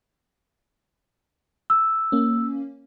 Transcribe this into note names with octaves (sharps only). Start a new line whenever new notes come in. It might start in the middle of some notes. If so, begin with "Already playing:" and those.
E6
A#3 C#4